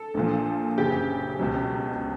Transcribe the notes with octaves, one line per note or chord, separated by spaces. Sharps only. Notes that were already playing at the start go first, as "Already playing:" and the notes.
Already playing: A4
A#1 A#2 F3
F#1 F#2 C#3 G4
C#2 B2 F#3